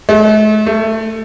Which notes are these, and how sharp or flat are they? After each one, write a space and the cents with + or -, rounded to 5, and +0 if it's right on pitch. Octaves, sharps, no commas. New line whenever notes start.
A3 -45
A3 +10